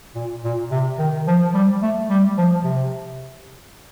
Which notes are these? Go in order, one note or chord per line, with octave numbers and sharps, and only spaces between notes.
A#2
A#2
C3
D#3
F3
G3
A3
G3
F3
C3